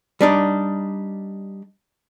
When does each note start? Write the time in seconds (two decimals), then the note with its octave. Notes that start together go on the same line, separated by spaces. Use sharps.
0.21 G3 D4 D#4